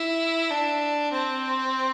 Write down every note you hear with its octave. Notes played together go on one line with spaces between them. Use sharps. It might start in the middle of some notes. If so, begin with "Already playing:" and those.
Already playing: E4
D4
C4